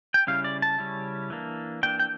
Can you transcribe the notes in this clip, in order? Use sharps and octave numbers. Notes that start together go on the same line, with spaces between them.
G5
C#3 G3 C#4 E4 F5
D5
A5
C#3 G3 C#4 E4
E3 A#3 D4
E3 A#3 D4 G5
G5